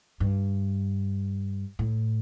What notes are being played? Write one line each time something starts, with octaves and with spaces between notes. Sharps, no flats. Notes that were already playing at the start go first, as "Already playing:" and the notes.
G2
A2